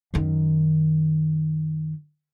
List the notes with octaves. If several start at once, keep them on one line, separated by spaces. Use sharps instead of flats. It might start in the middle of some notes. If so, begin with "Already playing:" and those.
F#2 D#3